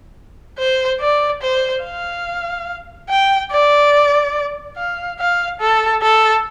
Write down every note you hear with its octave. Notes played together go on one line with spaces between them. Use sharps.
C5
D5
C5
F5
G5
D5
F5
F5
A4
A4